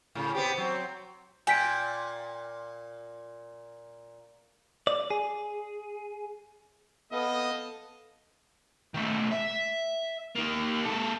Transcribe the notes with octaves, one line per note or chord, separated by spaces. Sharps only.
A2 C#3
B3 C4 G4
F#3 C4
A#2 G5 G#5 B6 D7
D5
G#4
B3 A4 D#5 F5
D#3 A3
E5
D#3 A#3
A#3 A4